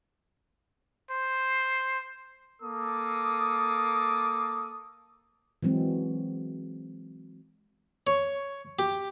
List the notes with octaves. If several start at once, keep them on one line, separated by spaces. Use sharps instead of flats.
C5
A#3 A4 D6 D#6
E3 F#3 G#3 C4
C#5
G4